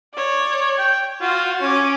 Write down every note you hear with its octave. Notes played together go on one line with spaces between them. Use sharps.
C#5 D5
G5
F4 F#4
C#4 C#5 D6